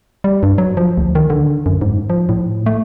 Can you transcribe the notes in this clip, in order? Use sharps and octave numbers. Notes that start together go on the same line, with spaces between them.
G3
G2
F#3
F3
D2
D#3
D3
F#2
G#2
F3
A2
A3